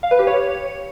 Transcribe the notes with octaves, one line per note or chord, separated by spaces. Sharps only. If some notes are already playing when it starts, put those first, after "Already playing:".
F5
B4
G4
C#5